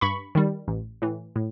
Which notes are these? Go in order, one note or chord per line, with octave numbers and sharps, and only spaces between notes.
G2 B5 C#6
D#3 G3
A1
A2 E3
A2